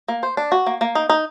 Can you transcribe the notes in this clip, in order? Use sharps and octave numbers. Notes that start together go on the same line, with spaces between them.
A#3
C5
D4
F#4
A#3
A#3
D#4
D#4